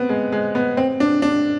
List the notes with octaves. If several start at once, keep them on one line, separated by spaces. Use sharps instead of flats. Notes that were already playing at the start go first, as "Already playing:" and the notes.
Already playing: B3 C4
G#3
G#3
B3
C4
D4
D4